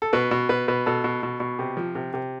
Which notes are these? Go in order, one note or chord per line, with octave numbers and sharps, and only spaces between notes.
A4
B2 B4
B2
B2 B4
B2 B4
B2 A4
B2
B2
B2
C3
F3
C3
C3